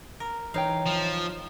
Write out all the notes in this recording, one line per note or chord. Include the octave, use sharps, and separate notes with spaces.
A#4
E3 D#4 C#5 F5 G5
F3